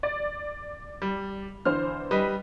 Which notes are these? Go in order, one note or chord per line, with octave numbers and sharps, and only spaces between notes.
D5
G3
D3 E3 C5 F6
G3 B4 D#5